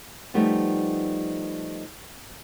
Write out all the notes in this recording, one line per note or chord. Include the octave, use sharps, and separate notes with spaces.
F3 G3 A3 B3 D#4